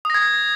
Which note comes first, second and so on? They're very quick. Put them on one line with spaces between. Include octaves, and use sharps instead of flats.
D#6 A#6 G#6